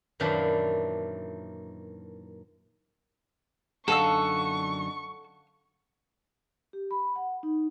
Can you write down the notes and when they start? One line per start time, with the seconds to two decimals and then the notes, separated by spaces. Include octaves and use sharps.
0.20 F#2 A#2 D#3 E3 A#3 D4
3.88 F#2 D3 D#4 A4 F5 F#5 C#6 E6
6.73 G4
6.91 B5
7.16 F#5
7.43 D#4